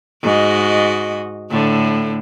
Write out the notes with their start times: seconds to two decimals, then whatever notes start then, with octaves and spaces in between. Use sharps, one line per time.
0.22 G#2 F#4 D#5
1.51 A2 D3